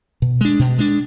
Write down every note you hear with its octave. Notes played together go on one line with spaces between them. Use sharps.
B2
G#3 D4
B2
G#3 D4